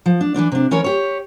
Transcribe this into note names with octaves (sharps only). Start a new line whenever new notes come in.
F3
D4
E3 F3 D4 D5
C3 D4
E3 C#4 A#4 C#5
G4 C#5